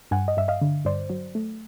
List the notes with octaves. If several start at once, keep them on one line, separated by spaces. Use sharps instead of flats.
G2 F#5 G#5
D#5
G2 E5
D#5 F5
D3
G2 C5 D5
F#3
A3